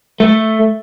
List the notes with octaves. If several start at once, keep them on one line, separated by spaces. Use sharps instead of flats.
A3